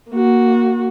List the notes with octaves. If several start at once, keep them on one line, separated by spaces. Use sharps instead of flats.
A#3 F#4